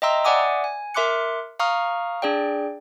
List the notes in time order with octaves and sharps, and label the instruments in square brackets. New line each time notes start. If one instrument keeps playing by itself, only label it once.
[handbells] D#5 E5 G5 A#5 C6 E6
D5 E5 F#5 G#5 D6 D#6
G#5
A#4 E5 C6 D6 F#6 C#7
F5 A#5 C#6 D#6 F6
D4 G#4 D5 G5